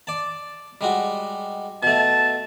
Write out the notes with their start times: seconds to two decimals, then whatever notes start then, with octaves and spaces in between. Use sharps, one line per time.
0.07 D5 A5
0.81 G3 G#3 F#4
1.83 B2 A3 A5